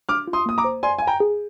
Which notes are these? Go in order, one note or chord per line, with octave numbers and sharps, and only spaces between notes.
D4 D6 F6
F4
C6 D#6
A#3 D#6
A#5 D6
C5
D5 G#5 C6
F5 G#5
G5 A#5
G#4